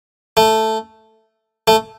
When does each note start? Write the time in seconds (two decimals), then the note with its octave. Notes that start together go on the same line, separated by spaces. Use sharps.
0.37 A3
1.68 A3